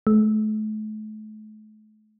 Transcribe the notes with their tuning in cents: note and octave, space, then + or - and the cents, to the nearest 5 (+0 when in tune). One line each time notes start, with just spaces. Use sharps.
A3 -40